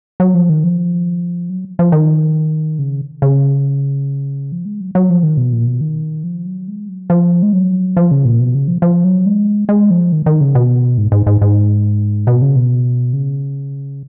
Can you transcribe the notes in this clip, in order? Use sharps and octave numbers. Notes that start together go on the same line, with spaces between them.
F#3
F3
D#3
F3
F#3
F3
D#3
C#3
C#3
F3
G#3
F#3
F#3
F3
D#3
B2
A#2
B2
D#3
F3
F#3
G#3
F#3
F3
G#3
F#3
F3
C#3
A#2
B2
C#3
F3
F3
F#3
G#3
G#3
F3
D#3
D#3
C#3
B2
G#2
G#2
G#2
G#2
B2
C#3
B2
C#3